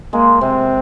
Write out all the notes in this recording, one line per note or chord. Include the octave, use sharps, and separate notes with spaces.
G#3 A#3
C3 C4